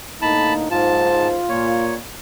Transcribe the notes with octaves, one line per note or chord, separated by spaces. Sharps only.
A2 D3 A#3 D#4 A5 B5
F#1 G#2 D#4 F4 C5 A5
A#2 C#5